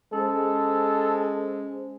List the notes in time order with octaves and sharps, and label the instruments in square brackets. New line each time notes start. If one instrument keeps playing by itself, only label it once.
[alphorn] G#3 [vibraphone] C#4 C5 [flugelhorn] A4